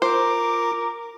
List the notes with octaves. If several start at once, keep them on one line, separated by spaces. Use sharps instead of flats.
F4 A#4 C5 D6